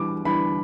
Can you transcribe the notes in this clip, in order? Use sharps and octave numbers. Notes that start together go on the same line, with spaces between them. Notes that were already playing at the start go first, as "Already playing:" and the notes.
Already playing: E3 G3 D4 D6
E3 G3 D4 B5